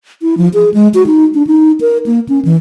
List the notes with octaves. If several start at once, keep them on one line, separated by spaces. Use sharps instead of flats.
E4
F3
G#4
G#3
F#4
D#4
D4
D#4
A#4
A#3
C#4
E3